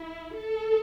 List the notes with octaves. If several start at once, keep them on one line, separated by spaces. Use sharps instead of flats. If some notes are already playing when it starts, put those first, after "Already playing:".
Already playing: E4
A4